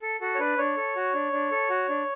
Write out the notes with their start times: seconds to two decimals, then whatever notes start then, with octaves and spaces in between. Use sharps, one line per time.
0.02 A4
0.21 F#4 A4
0.35 C#5
0.39 D4 B4
0.58 D4 C#5
0.77 A4
0.96 F#4
1.14 D4
1.32 D4
1.51 A4
1.70 F#4
1.89 D4